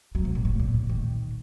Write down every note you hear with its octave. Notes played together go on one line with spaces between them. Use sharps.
F#3
C3
A#2
A2
A#2
D3
D#3